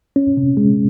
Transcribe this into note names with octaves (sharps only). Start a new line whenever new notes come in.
C#4
C3
G#3